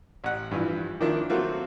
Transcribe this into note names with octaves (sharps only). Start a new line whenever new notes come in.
A1 F#5
G2 E3 F3
D#3 F3 A#3 D4 E4
F#3 A3 A#3 C4 F4 F#4